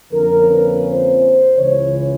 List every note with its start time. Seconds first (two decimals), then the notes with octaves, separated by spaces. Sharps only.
0.11 F2 D3 F3 A#3 C#4 A#4
0.47 B4
0.83 C5
1.56 C#2 C#3 E3 C#5